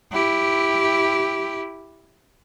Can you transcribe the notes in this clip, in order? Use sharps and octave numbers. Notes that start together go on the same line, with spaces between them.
E4 G4